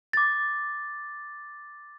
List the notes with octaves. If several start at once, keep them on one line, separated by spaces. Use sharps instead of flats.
D6 A6